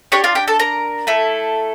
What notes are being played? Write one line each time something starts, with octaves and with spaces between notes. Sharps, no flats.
D4 G4 C#5 C#6
F4 F5
G4 G5
A4 A5
A#4 A#5
A3 E4 A4